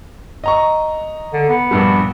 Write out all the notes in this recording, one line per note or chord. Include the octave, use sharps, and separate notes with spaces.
D#5 A#5 C#6
D3
B3
A#1 G2 G3